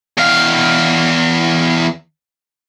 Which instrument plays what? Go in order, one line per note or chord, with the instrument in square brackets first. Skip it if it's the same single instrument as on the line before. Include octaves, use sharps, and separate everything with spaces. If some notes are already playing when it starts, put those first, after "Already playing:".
[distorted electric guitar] E2 F5